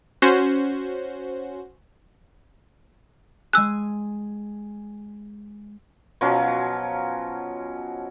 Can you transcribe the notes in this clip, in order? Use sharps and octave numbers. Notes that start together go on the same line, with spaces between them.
C#4 F#4 C5
G#3 G#5 E6 F#6
B2 F3 F#3 C#4